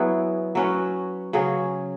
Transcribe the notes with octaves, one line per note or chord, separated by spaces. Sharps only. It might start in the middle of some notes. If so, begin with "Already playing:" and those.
Already playing: F#3 B3 E4 G#4
F#3 C#4 F#4 B4
C#3 F#3 C#4 G#4